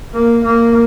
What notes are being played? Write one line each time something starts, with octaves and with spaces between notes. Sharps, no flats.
A#3
A#3